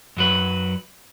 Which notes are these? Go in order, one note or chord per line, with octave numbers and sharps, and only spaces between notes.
F#2 F#3 B4